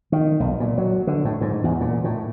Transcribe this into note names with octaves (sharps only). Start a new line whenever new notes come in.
D#3
B1
A#2
F#3
D3
A2
G#2
E2
A#2
A2